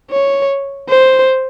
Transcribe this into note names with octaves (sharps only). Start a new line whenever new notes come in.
C#5
C5